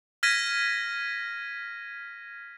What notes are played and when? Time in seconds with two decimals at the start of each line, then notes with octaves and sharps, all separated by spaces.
0.23 F6 G#6 A#6 B6 D#7